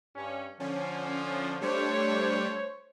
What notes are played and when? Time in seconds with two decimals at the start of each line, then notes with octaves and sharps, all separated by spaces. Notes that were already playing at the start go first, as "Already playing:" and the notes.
0.15 G2 C#4
0.60 D3 F3 C#4
1.61 G3 A3 D4 C5 C#5